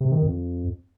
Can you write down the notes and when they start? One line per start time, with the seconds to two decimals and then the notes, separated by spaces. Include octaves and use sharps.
0.01 C3
0.11 D#3
0.22 F2